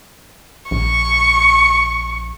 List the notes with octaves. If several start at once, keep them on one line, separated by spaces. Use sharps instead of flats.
A#1 C#6